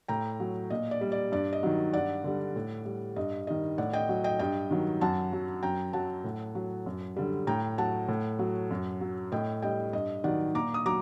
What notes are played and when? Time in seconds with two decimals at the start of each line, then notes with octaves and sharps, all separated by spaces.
0.08 A2 G5 A#5
0.40 F#3
0.70 A#2 D#5
0.91 D5
1.01 G3
1.12 D5
1.32 G2 D5
1.53 D#5
1.63 D#3 F#3
1.93 G2 D5 F#5
2.24 D3 G3
2.56 A2
2.85 G3
3.16 G2 D#5
3.47 D#3 G3 D#5
3.78 A2 D5 F#5
3.93 D#5 G5
4.09 F#3
4.24 D#5 G5
4.39 G2 D#5 G5
4.70 D#3 F#3
5.01 F#2 F#5 A5
5.33 F#3
5.63 F#2 G5 A#5
5.93 F#3 F#5 A5
6.24 A2
6.55 F#3
6.86 F#2
7.16 D3 G3
7.47 A2 G5 A#5
7.78 F#3 F#5 A5
8.08 A2
8.39 F#3
8.71 F#2
9.01 F#3
9.32 A2 D#5 G5
9.62 G3 D#5 G5
9.93 G2 D#5
10.24 D#3 F#3 D5 F#5
10.54 A#2 A#5 D6
10.74 D#6
10.86 F#3 A#5 D6